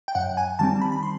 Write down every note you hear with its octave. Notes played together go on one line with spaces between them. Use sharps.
G5
F#2 F#5
G#5
D#3 G3 C4 A5
B5
B5
C6